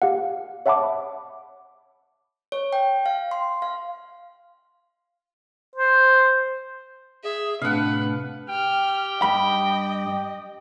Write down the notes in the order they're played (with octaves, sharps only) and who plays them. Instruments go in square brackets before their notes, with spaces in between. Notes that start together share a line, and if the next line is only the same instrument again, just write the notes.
[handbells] G4 F5 F#5
C#5 E5 F#5 A5 B5 D6
[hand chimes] C#5
G5
F5
C6
F5
[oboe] C5
[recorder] G#4 [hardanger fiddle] E5
[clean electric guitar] A2 C3 [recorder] D4 [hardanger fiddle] B4 [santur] F5 F#5
[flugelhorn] G4 [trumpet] G5 [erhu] F6
[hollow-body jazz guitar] G2 B5 [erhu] D#5